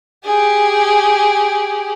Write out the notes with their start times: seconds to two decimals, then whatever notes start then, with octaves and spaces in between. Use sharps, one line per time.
0.24 G4 G#4